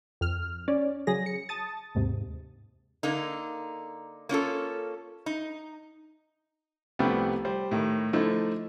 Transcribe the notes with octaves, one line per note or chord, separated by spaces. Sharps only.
F2 F6
C#4 D5
C#3 F#3 G#4 A#6
C#7
A5 D#6 A6
D#2 G#2 C3
D3 A#3 D#4
A#3 C#4 F4 A4
D#4
C2 F3 G3 A3 B3
G3 C5
A2 D#3
D3 F3 A3 D#4 E4